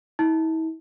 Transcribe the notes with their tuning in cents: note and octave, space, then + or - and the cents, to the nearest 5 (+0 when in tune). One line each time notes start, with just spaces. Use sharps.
E4 -45